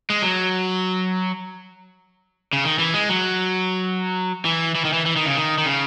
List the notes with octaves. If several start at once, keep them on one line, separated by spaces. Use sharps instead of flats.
G#3
F#3
C#3
D#3
E3
G#3
F#3
E3
E3
D#3
E3
E3
D#3
C#3
D#3
D#3
C#3